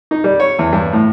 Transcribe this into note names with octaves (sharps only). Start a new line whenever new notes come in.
D#4
G3
C#5
E2
G2
A2